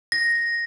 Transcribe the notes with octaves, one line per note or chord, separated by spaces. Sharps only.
A#6